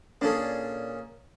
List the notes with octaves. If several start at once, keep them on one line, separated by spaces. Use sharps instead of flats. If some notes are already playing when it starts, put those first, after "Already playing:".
A#2 C#4 D4 G#4 A4